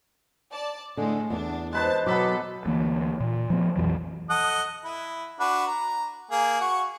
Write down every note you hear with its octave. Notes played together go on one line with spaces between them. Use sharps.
D5 A5
A2 D3 G#3
E2 B3 D4
G#3 B4 C5 A5
B2 F#3 B3 A4 B5 D6
D2 E3 A#3
A#2
F3 A3 B3
B1 F2 E3 F#3
A4 D#5 F#5
E4
D4 F#4 B4
A#5
A#3 G#4
F#4 C#6